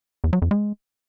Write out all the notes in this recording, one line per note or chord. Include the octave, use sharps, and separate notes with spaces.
E2
F#3
F2
G#3